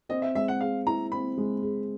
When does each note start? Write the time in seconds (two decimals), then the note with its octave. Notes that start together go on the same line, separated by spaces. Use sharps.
0.09 C4 D#5
0.22 E5
0.35 G#3 E5
0.48 F#5
0.61 G#4 F5
0.87 E4 A#5
1.12 C4 B5
1.37 G#3
1.63 G#4